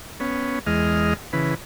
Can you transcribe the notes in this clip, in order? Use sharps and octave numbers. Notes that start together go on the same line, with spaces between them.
B3 C#4
E2 G#3 D#5 F6
C#3 E3 B4